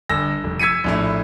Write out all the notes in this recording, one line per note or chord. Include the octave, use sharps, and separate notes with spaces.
G1 E6 A#6
F1
E6 G#6 B6 C#7 D#7
A#1 A2 E4